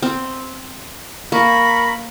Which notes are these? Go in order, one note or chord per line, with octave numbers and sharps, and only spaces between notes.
C4
A#3 A#4 B5 C#6